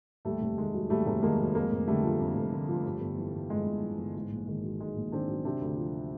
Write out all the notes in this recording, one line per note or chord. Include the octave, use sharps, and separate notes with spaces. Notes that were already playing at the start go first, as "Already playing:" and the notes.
D#2 G3 A3
F1
D#3 G#3
F#3
D#2 G3 A3
F1
D#3 G#3 A#3
F#3
F2 G#3 A#3
F1
D3 G3 A3
F3
F2
F1
D3
F3
G2
G1
E3
G1
G2 G#3
G1
E3
G1
G#2 G#3
A#1
D#3 G#3
F#3
G#2 G#3
A#1
D#3 C4 D4
F#3
C3 C4 D4
D2
F3